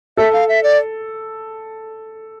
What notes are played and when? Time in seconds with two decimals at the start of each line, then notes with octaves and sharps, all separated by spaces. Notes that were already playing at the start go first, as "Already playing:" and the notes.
0.17 A4 E5
0.33 F5
0.49 E5
0.63 D5